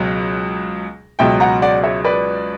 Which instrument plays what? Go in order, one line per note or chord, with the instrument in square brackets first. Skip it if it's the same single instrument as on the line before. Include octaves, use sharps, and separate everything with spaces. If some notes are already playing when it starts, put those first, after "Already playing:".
Already playing: [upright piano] C#2 B2 F#3
C#2 B2 F#3 E5 G5
F#5 A#5
D5 F#5
C#5 E5
B4 D5